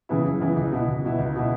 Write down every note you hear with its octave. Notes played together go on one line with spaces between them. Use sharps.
C#3 E3 B3 E4
F#2
C#3 E3 B3 E4
C#2
B2 B3 E4
C#2
B2 B3 E4
C#2
B2 B3 E4